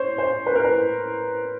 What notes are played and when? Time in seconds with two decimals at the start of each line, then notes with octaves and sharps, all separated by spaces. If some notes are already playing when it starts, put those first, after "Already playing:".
Already playing: C5 C#5
0.18 C5
0.46 B4
0.55 A#4
0.64 B4